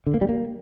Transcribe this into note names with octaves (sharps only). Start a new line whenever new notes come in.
D3
A#3
G3
A#3